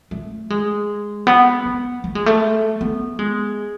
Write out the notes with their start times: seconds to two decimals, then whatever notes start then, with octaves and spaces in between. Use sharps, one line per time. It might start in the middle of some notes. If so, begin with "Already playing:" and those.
0.11 A3
0.50 G#3
1.27 B3
1.65 B3
2.04 A3
2.15 G#3
2.26 A3
2.81 B3
3.19 G#3